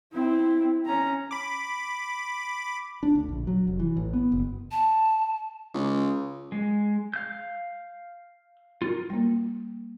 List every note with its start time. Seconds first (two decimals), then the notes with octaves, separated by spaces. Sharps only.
0.13 C4 E4
0.86 C#4 A#5
1.31 B5 D6
3.03 D4
3.15 D2
3.28 A#1
3.47 F#3
3.67 F1
3.79 E3
3.97 A1
4.13 B3
4.32 F#1
4.71 A5
5.74 C#2
6.52 G#3
7.14 F5 G6
8.82 F4 A#4
9.10 G3 A#3